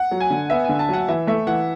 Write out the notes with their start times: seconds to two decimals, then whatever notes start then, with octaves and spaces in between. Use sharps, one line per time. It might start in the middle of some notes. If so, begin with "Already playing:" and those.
Already playing: F#5
0.11 F#3
0.20 G#5
0.30 D3
0.50 B3 E5
0.64 D3 G#5
0.79 A5
0.89 F#3 F#5
1.08 E3 E5
1.27 A3 E5
1.47 E3 F#5